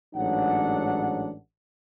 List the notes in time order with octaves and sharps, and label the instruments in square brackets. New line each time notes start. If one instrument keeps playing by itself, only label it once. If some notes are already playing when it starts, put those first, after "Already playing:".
[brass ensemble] A1 G#2 F#3 D4 D#4 F#5